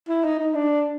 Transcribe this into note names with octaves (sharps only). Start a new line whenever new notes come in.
E4
D#4
D#4
D4